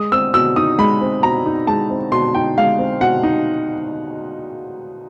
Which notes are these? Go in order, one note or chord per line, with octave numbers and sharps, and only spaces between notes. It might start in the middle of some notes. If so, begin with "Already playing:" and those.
Already playing: G#3 D#6
C4 E6
B2 E6
D#4 D#6
G#3 B5
C4
B2 A#5
D#4
G#3 A5
C4
B2 C6
D#4 G5
G#3 F5
C4
B2 F#5
D#4